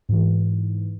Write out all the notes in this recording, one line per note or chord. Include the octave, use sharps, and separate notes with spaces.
G#2 E3